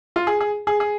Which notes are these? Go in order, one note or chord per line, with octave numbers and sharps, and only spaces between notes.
F4
G#4
G#4
G#4
G#4